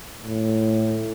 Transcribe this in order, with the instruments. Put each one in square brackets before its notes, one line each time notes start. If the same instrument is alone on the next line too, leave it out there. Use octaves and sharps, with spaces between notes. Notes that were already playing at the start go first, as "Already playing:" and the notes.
[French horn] A2